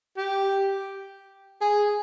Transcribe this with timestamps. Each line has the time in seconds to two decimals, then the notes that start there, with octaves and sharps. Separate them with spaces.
0.17 G4
1.61 G#4